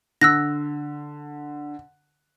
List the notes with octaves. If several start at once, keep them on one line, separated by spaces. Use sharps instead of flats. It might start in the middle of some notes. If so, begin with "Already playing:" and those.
D3 E6 F#6 A#6